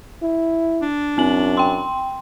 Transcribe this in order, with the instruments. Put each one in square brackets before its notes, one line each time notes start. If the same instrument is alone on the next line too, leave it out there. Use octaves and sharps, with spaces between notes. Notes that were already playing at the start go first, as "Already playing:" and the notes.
[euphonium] E4
[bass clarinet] D4
[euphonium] F#2 [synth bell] C4 F#7
[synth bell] G5 C6